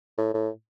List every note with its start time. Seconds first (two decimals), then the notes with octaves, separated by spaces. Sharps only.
0.18 A2
0.34 A2